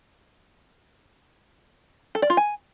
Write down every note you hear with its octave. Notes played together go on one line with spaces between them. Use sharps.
A4
D5
F4
G#5